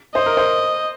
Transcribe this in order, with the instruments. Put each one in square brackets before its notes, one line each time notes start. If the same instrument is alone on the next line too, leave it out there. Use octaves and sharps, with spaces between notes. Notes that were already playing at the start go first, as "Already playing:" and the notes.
[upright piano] C5 [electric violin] D#5
[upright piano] A#4
C5